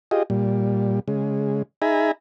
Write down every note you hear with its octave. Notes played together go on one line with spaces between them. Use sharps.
F4 G4 G#4 D#5
A#2 G3
C#3 G#3
D#4 G#4 E5 G#5 A#5 B5